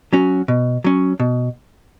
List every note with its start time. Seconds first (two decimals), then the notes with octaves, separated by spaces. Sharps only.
0.13 F#3 C#4 F#4
0.48 B2
0.84 F#3 C#4
1.20 B2